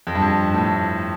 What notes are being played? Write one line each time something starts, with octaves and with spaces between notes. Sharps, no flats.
F2
G2
F2
A2